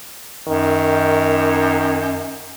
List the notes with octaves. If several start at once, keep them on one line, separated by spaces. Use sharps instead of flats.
F#2 D#3